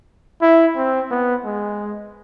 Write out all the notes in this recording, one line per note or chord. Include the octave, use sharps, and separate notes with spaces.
E4
C4
B3
G#3